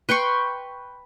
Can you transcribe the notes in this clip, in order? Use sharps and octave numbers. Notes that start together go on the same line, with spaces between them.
B4 G5 C6 C#6